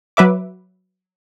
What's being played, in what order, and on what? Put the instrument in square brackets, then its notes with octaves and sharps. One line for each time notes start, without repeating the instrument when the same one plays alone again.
[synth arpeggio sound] F#3 B4 E5 D6